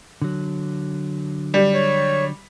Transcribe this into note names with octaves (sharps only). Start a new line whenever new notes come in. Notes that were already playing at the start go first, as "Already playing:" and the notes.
D3 F#3
G3
C#5